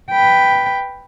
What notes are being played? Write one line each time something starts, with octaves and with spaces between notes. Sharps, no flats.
B4 G5